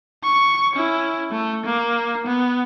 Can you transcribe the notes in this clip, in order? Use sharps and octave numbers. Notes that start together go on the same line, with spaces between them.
C#6
C#4 E4
A3
A#3
B3